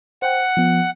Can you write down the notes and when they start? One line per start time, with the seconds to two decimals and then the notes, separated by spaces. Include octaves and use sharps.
0.22 C5 F#5 G5
0.57 F3 B3